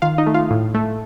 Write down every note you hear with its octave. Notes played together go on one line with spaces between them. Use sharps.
D#3 F4 F5
D#4 D#5
A3
F4 F5
A2
A3